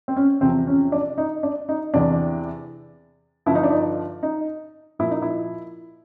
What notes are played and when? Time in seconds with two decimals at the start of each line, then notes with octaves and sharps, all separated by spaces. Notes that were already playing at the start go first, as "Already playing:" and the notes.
0.08 C4
0.16 C#4
0.41 E2 C3 F3 C4
0.67 C#4
0.92 D4
1.18 D#4
1.43 D4
1.69 D#4
1.94 E2 C3 E3 D4
3.46 G2 D3 F3 E4
3.55 D#4
3.63 D4
3.71 D#4
4.23 D#4
4.99 A#2 F3 E4
5.11 D#4
5.22 E4